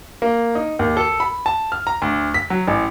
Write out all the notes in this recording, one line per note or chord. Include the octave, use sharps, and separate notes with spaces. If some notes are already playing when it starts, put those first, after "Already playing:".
A#3
D#4
D#2
A4
B5
A5
F6
A#5
D2
B6
F#3
A1